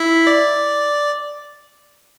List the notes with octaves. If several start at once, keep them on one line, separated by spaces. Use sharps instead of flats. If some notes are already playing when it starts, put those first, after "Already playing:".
Already playing: E4 E5
D5